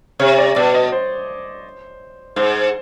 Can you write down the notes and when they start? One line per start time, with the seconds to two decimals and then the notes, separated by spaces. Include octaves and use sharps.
0.19 C3 C#5
0.38 D5
0.55 B2 D5
0.74 D#5
0.92 C5
2.36 G#2 C5